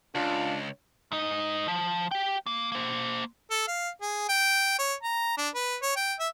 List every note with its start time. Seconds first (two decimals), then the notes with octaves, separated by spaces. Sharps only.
0.15 C#2 D4 F4
1.12 G#2 D#4
1.68 F3
2.11 G4 G5
2.46 A#3
2.72 A#3 C5
3.50 A4
3.67 F5
4.01 G#4
4.29 G5
4.78 C#5
5.03 A#5
5.37 D4
5.54 B4
5.82 C#5
5.96 G5
6.19 E5